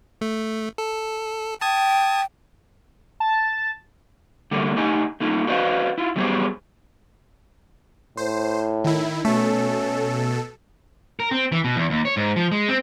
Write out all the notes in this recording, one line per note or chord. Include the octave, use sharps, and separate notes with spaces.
A3
A4
G5 A5 D#6 G#6
A5
D3 G3 A3 A#3
A3 D#4 G4 D#5 G#5
A3 A#3 D#4 F4
F#4 B4 C5 D5 D#5 F5
E4 F4
F#3 G3 B3 G4 G#4 C5
A2 C5
D#3 E4
B2 A3 C#4 A4
A#4
C4
E3
B2
E2
D#2
C#5
G#2
F3
G#3
C4